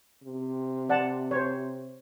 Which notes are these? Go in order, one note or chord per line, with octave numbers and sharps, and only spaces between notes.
C3
D5 F#5 A5
C5 C#5